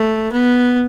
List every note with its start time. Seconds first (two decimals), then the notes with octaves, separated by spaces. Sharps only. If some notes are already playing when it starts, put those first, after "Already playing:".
Already playing: A3
0.32 B3